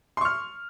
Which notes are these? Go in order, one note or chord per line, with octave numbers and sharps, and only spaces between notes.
C6 C#6 F6